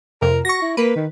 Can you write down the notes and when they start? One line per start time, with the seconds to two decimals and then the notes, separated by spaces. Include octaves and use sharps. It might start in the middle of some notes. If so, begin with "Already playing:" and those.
0.22 F2 C3 A#4
0.45 F#4 C#6 A#6
0.62 E4
0.77 A#3 B4
0.96 D#3